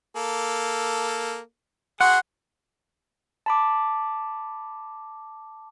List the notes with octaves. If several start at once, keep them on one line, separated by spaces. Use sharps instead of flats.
A#3 A4
F#4 G#4 F#5 C6
A5 B5 D6